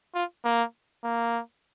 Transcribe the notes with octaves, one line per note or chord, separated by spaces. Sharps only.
F4
A#3
A#3